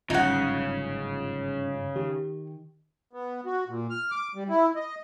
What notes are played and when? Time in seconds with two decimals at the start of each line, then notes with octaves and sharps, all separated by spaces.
0.10 G1 G#2 C#3 F#3 C#4 D#4 F4 F#5
1.96 D#3 G4
3.13 B3
3.46 F#4
3.68 A#2
3.90 F6
4.11 D6
4.35 G3
4.49 E4
4.76 D#5